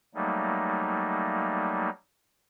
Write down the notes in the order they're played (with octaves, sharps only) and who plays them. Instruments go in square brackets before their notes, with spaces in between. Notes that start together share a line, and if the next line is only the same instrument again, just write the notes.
[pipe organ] F#3 G3 A3 A#3 D#4